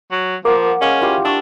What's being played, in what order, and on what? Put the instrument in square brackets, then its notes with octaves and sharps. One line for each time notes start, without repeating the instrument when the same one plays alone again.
[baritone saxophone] F#3
[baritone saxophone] F3 [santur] A#3 F#5 [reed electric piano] A#4 D6
[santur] G#3 F5 [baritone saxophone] C#4
[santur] E4 F4 G4
[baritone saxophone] D4 [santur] C#6 E6